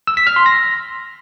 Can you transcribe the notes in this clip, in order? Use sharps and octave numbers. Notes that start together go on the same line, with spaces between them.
E6
B6
F6
C6
A#6